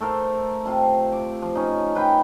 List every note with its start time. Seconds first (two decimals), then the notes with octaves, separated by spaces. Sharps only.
0.01 A3 A4 A#4 C5
0.66 C3 F4 A5
1.12 D6
1.42 F3
1.55 C#4 D#4
1.95 F4 B4 G5 B5